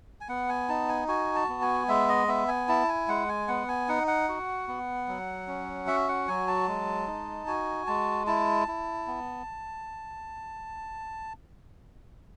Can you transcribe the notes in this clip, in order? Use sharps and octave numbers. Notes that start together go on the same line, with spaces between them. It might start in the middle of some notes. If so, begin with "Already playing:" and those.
G#5
B3 F#5
G#5
D#4 A5
G#5
F#4 G#5
A5
B3
G#5
G#3 E5
D#5
B3 E5
G#5
E4 A5
G#5
G#3 F#5
G#5
B3 F#5
G#5
D#4 F#5
F#5
F#4
B3
F#3
C#4
F#4 E5
F#5
F#3 G#5
A5
G#3
D#4
F#4 G#5
G#3 A5
E4 A5
E4
B3